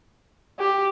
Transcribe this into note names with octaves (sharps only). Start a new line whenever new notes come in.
G4